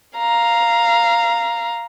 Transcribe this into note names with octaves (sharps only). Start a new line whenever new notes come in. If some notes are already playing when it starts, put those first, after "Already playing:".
F5 A#5